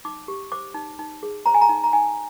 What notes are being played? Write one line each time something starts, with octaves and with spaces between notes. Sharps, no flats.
D#4 D6
G4
C5 D6
D#4
D#4
G#4
C5 A#5
G#5
A#5
D#4
A#5
D#4 G#5